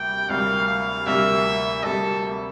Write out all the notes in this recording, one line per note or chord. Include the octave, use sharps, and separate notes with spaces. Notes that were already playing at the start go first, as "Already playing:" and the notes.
Already playing: D2 C3 G3 A#3 G5
D2 C3 G3 A#3 F5
F5
D2 C3 G3 A#3 E5
D2 C3 G3 A#3 A4